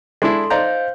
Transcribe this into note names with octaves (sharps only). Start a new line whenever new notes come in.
G#3 D4 E4 A4 C6
D#4 C5 D5 F5 A#5 G6